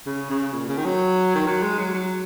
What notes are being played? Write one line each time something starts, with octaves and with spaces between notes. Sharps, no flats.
C#3
C#3
A#2
C#3
D#3
F#3
D#3
F#3
G#3
F#3
F#3